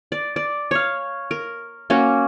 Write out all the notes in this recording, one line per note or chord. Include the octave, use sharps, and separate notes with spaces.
D5
D5
C#5 F5
A#4
A#3 C#4 F#4